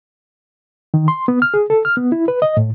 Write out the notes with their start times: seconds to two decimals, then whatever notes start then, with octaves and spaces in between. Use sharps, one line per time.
0.94 D#3
1.08 C6
1.28 B3
1.42 F6
1.54 G#4
1.70 A4
1.85 F6
1.97 B3
2.12 E4
2.28 B4
2.42 D#5
2.57 A2